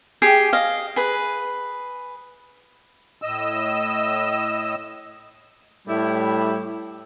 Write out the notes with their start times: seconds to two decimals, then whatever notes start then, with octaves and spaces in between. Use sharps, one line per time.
0.22 G4 G#4 G5
0.53 D#5 F5
0.96 G#4 B4
3.22 A2 D#5 E6
5.88 A2 G3 E4